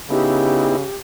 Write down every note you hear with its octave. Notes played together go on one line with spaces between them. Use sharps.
C#3 B3 D#4 E4 G4